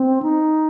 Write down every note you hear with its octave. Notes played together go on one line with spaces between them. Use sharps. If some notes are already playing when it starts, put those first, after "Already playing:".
Already playing: C4
D#4